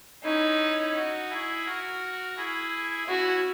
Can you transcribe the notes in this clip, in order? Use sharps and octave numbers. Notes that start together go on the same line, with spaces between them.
C#4 D#4 E4
D#4 F#4
E4 G#4
F#4 A#4
E4 G#4
C#4 E4 F#4